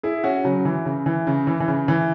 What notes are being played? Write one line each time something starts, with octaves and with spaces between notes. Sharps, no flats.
E4 G#4
C#4 F#4
C#3 F#3
E3
C#3
E3
C#3
E3
E3
C#3
E3